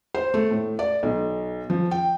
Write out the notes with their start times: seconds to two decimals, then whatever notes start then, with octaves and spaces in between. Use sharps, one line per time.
0.15 C5
0.34 A3
0.51 A2
0.79 D5
1.03 B1
1.70 F3
1.91 G5